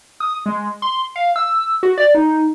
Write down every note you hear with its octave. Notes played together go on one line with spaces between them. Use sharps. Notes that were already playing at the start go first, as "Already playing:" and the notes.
D#6
G#3
C6
F5
E6
F#4
D5
D#4